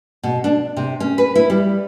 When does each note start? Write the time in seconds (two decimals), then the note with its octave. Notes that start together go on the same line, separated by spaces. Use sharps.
0.23 B2
0.44 D4
0.77 C3
1.00 C#4
1.18 B4
1.35 E4
1.50 G3